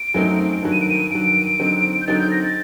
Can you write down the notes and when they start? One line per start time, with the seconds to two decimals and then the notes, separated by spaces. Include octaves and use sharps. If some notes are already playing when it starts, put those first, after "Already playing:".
Already playing: D7
0.14 F#2 F#3 A3 C4 D#4
0.62 G2 D#3 F#3
0.72 D#7
0.81 D7
0.90 D#7
1.10 G2 D#3 F#3 D7
1.59 D3 F#3 C4 D#4
2.02 G6
2.07 D3 F#3 C4 D#4 A6
2.19 G6
2.31 A#6
2.43 A6